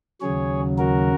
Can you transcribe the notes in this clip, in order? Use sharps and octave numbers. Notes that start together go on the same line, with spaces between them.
D#2 C#3 F#3 G#4 C#5
F#4 A#4